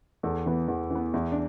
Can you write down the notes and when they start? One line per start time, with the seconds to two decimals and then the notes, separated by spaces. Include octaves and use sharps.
0.23 E2 A4
0.46 E3 B3
0.68 E2
0.90 E3
0.95 B3
1.14 E2 E4
1.32 D4